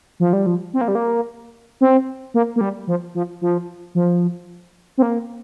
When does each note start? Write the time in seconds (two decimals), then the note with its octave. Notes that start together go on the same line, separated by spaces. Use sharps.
0.20 F3
0.33 G3
0.46 F3
0.74 C4
0.81 A#3
0.88 G3
0.95 A#3
1.81 C4
2.34 A#3
2.56 A#3
2.61 G3
2.87 F3
3.15 F3
3.41 F3
3.95 F3
4.98 C4
5.02 A#3